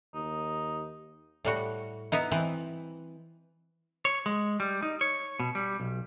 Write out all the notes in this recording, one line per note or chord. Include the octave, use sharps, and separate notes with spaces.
D#2 D#4
A2 G3 F#4
B3 D#4 E4
E3 C4
C#5
G#3
G3
D#4
C#5
B2
G3
B1